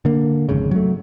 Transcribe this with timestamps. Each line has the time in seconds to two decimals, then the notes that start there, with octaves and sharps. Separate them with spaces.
0.05 D3 A#3
0.49 G#1 F2 G#2 C#3
0.71 F#3 A3